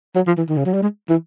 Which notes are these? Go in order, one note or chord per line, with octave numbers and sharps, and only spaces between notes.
F#3
F3
E3
D#3
C#3
F#3
G3
G#3
E3